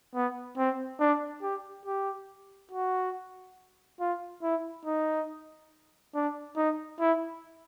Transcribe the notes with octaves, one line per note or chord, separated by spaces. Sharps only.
B3
C4
D4
G4
G4
F#4
F4
E4
D#4
D4
D#4
E4